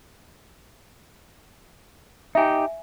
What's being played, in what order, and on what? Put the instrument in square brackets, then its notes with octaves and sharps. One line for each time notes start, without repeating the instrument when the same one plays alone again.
[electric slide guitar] D#4 G4 [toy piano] E5 G#5